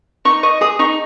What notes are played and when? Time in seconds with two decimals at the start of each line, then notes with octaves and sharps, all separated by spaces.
0.25 D#4 C#6
0.43 D#5 C#6
0.61 G#4 D#6
0.79 D#4 C#6